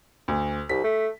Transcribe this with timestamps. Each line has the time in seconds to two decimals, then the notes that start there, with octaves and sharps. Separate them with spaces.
0.28 D2
0.69 C2 B6
0.84 A3